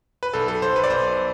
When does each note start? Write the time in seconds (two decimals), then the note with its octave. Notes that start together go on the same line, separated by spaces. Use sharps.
0.23 B4
0.34 B1 A4
0.48 A4
0.62 B1 C5
0.76 B4
0.84 D5
0.90 B1 C5